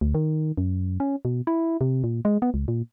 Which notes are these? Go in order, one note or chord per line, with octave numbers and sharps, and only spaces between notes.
D2
D#3
F#2
C#4
B2
E4
C3
A#2
G#3
B3
C#2
A#2